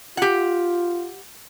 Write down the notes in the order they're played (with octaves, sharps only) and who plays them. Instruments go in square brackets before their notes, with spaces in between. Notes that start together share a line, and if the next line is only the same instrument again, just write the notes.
[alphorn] F4 [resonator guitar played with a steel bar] G4 F#5